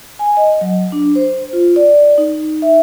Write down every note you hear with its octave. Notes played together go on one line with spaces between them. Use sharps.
G#5
D#5
F#3
D4
C5
F4
D5
D#4
E5